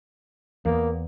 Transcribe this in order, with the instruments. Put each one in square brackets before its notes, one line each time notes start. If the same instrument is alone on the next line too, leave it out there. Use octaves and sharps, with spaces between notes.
[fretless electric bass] E2 [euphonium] A#3